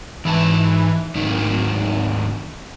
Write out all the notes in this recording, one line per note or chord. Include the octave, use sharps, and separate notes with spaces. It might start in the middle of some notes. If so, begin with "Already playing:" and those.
G#2 E3 G#4 A5
D1 G#2 D#3 A#3